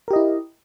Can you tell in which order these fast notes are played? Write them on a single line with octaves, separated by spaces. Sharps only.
A#4 G4 D#5 E4